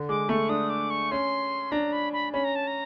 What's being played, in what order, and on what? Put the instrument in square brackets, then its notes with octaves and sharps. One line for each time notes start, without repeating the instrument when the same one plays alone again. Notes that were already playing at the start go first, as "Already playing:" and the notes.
Already playing: [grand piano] D3
[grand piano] G#3 [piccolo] D6
[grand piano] A3 [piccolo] C#6
[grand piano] D4 [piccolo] D#6
[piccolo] D6
C#6
[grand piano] C#4 [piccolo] C6
[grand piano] D4 [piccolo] A#5
[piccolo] B5
B5
[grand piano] C#4 [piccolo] B5
[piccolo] A#5
A5
A#5